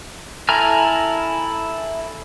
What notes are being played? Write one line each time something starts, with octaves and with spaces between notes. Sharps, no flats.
E4 A4 G#5 A#5 F6